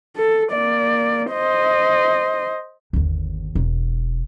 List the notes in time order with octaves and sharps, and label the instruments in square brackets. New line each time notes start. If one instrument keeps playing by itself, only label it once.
[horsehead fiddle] A4
A#3 D5
C5 D#5
[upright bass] G1 D#2
E1